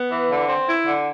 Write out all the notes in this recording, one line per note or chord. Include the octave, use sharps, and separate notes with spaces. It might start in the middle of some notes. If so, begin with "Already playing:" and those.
Already playing: B3
E3
D3
C4
E4
D3